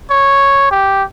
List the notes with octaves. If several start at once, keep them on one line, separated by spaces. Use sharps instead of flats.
C#5
G4